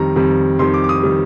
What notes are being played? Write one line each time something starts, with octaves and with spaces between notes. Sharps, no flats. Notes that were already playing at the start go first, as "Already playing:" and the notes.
Already playing: F2 D#3 G3 A#5
F2 D#3 G3
F2 D#3 G3 C6
D6
D6
D#6
D#3 G3